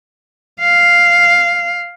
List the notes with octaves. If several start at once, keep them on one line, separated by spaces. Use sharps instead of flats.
F5